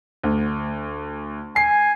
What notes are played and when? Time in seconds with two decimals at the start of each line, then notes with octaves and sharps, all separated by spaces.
0.23 D2
1.56 G#5 C7